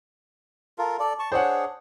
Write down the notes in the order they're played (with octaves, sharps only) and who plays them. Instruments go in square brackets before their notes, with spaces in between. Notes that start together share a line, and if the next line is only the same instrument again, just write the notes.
[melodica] F4 A4 A#4
A4 D5
A5 C#6
[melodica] D4 G#4 [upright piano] C5 C#5 F#5